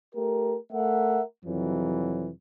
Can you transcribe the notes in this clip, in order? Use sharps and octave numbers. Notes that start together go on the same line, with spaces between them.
A3 G4 A#4
A3 A#4 E5 F#5
F2 C3 E3 F#3